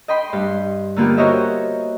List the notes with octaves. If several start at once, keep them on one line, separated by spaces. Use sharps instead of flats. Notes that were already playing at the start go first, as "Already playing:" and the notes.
D#5 G5 B5 C6
G2 C6
D3 A#3 B3 F4 G4
F#4 A#4 C5 C#5 D#5 E5